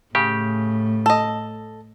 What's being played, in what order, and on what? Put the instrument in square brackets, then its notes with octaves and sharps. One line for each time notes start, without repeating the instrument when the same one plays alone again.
[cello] A2 [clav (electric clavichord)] C#3 G4
[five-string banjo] A4 D#5